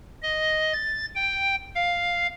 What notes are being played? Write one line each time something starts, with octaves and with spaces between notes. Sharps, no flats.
D#5
A6
G5
F5